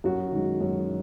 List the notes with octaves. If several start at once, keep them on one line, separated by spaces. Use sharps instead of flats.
F#2 F#4
D#3 G#3
F#2